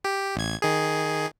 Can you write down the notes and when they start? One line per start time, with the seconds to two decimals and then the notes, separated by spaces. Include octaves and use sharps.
0.04 G4
0.35 A1 G#6
0.62 D#3 G#4